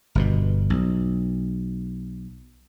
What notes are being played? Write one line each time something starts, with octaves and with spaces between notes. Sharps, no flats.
G1 G2 B2
B1